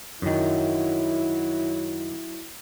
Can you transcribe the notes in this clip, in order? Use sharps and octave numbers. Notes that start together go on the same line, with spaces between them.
F#2 D#3 F#3 E4